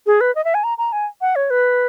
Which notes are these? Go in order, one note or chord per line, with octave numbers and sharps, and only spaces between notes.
G#4
B4
D#5
E5
G#5
A#5
A#5
G#5
F#5
C#5
B4